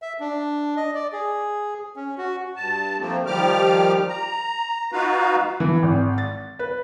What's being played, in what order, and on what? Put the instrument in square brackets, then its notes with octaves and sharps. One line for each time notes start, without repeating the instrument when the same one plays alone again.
[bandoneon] E5
D4
D#5
D5
G#4
C#4
F#4
[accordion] G2 A5
F3 A3 A#3 C4
D#3 F3 G3 G4 D6 F6
A#5
D#4 F4 F#4 B4 F5
[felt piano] E3
G#1
A6
B4